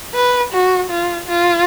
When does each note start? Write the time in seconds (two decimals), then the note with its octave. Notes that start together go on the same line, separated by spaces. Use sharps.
0.14 B4
0.53 F#4
0.90 F4
1.28 F4